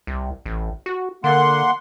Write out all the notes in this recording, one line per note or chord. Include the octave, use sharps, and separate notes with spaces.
C2
A1
F#4
D3 A#3 F#5 C6